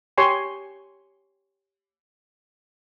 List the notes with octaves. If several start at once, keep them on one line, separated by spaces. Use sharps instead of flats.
G4 C#5 G#5 C6 C#6